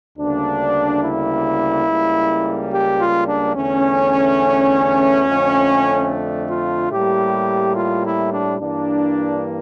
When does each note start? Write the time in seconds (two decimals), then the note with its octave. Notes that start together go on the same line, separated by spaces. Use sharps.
0.19 D2 C#3 G3 A#3 D4
1.02 E4
1.87 C#2 C#3 G3 A#3
2.72 G4
3.00 F4
3.28 D4
3.55 E2 D3 A3 C#4
5.24 F2 D3 A3
6.08 D4
6.50 F4
6.92 A2 G3 A#3 G4
7.76 F4
8.05 E4
8.32 D4
8.60 G2 E3 A#3 D4